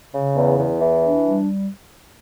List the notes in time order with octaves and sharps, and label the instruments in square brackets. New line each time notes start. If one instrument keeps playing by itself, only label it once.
[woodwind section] C#3
E2
E2
E3
D4
G3